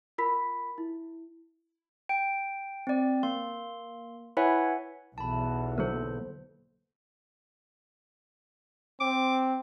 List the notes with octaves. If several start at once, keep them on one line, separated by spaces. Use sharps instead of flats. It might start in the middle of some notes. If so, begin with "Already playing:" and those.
F4 A#4 B5 B6
E4
G5
C4 D5
A#3 C6
E4 B4 C#5 E5 F#5 G#5
B1 E2 A5 B5
D3 F#3 A#3 A4 C5
C4 D6